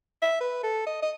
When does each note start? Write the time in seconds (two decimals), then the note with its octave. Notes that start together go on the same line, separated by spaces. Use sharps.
0.22 E5
0.40 B4
0.63 A4
0.86 D#5
1.02 D#5